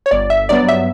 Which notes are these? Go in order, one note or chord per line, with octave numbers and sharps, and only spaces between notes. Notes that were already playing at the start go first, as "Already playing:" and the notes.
C#5
G1 D5
E5
G2 F#3 B3 D5
E5